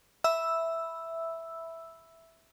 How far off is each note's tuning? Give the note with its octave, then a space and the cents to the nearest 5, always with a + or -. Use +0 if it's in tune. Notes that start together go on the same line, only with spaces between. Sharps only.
E5 +0 B5 +0 E6 +0